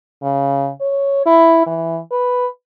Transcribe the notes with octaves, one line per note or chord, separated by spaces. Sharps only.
C#3
C#5
E4
E3
B4